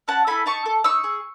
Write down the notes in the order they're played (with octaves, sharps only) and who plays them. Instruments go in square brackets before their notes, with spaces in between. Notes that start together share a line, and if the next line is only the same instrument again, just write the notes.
[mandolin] C#4 F#5 A5
E4 A4 G#5 B5
D#4 A5 C#6
A4
D#4 C#6 E6
G#4